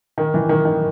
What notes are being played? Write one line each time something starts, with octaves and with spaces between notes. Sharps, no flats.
D#3
E3
D#3
D#3